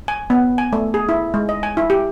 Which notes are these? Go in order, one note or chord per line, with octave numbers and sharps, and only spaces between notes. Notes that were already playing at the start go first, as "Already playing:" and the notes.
G#5
B3
G#5
A3
G#4
E4
G#3
D#5
G#5
E4
G4